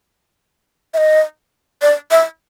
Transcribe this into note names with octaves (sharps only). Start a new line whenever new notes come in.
E5
D#5
D5
E5